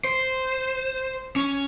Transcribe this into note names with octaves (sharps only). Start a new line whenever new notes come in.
C5
C#4